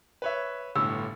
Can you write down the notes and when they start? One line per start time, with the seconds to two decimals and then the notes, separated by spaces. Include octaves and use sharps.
0.22 B4 C#5 E5
0.76 G1 A2 D4 E6